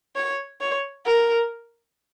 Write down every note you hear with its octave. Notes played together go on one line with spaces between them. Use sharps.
C#5
C#5
A#4